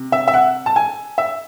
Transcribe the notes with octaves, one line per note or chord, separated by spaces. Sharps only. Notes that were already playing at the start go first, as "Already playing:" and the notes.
Already playing: C3
E5
E5
F#5
A5
G#5
E5